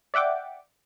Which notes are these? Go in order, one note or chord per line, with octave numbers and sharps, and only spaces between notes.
D5 E5 F#5 G5 D6